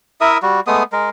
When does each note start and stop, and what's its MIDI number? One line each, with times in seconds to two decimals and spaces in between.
0.21 0.38 64
0.21 0.38 70
0.21 0.38 76
0.21 0.38 87
0.42 0.60 55
0.42 0.60 66
0.67 0.83 56
0.67 0.83 57
0.67 0.83 59
0.67 0.83 87
0.92 1.10 56
0.92 1.10 70